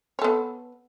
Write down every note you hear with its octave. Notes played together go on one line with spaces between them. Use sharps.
B3 A4 C#5